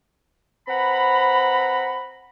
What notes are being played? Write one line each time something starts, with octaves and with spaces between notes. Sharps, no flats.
C4 B4 F#5 A#5 B5